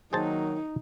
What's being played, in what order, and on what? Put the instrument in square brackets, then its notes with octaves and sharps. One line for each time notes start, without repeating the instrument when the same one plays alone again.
[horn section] D#3 F#3 A#3 [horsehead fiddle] D#4 [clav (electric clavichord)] G#4 C5 A5